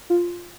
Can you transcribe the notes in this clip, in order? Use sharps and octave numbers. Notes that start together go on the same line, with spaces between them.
F4